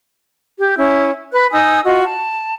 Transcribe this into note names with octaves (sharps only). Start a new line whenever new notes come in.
G4
C#4 E4
B4 F#6
D#4 G#5 D#6 E6
F4 F#4 D#5
A5